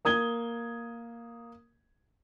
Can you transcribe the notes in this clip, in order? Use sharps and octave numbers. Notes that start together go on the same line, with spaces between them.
A#3 D#6 G#6 G7